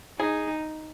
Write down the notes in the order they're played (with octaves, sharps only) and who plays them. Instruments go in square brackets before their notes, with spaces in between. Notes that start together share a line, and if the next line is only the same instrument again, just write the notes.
[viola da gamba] D#4 [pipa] G#4